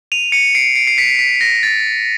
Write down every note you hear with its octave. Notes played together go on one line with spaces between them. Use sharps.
D#7 F7
C#7 D#7
C7 D7
C7 D7
C7
B6 C#7
B6
A#6
A6